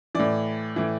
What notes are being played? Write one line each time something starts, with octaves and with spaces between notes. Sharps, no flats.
A2 E3 D5
A2 E3